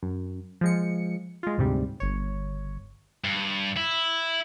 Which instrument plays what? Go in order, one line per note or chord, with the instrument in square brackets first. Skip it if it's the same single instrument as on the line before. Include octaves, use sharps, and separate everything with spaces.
[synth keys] F#2
F3 G#3 C#7
G#3 F4
D2 G#2 C3 G3
G1 C#5
[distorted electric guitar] G2
E4